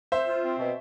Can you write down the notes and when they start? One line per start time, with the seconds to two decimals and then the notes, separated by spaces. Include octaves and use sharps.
0.12 C4 C5 E5
0.27 F4
0.43 C4
0.58 B2